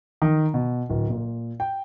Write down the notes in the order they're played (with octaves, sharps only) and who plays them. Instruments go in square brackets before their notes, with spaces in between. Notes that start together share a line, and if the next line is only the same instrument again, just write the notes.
[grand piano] D#3
B2
D1
A#2
G5